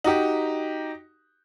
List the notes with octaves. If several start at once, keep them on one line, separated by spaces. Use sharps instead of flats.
D#4 F#4 G4